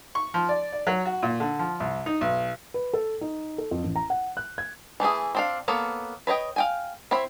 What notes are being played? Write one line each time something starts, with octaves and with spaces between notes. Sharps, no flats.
C#6
F3
D5
D5
F#3
F#4
A#2
D3
F3
C2
D#4
B1
B4
A4
D#4
A4
F2
A1
A#5
F#5
F#6
G#6
E3 A3 E4 G#4
C4 D4 F5
A#3 B3 A4 C#5
B4 C#5 D#5 G5
F5 G5 G#5
C4 E4 C#5 B5